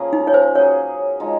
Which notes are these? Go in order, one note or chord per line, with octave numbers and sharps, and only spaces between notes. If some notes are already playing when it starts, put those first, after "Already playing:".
Already playing: C#3 F3 A#3 C#4 G#4
D#4
C#5
C5
F#3 C#4 G#4 C#5
F3 G#3 D#4